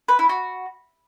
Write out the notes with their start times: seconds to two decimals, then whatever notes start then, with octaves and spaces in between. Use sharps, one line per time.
0.08 B4
0.19 E4
0.29 F#4